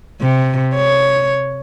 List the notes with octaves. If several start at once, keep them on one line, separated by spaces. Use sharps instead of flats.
C3
C#5